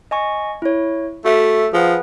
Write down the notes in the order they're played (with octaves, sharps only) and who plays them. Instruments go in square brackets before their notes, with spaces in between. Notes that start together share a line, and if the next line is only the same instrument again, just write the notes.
[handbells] D#5 G#5 C#6
E4 C#5
[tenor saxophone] A3 [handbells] F#4 E5 E6
[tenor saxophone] F3 [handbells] G#4 B4 F#5